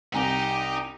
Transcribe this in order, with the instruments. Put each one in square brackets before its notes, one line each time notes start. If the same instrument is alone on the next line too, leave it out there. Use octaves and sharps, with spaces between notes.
[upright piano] C2 G#5 [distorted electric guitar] D#4 [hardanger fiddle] G4